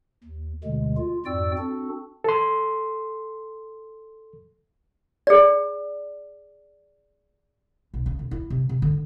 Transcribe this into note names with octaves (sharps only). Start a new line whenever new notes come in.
D#2
D2 B2 D3 G#3
F4
F2 G#2 F#4 D5 G5 E6
C4 D4 F#4 A4
A4 C6
G#4 D5
B1
C#3
E1
E4
C3
C3
D3